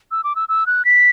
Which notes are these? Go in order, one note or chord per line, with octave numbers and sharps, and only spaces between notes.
E6
D6
E6
E6
F#6
B6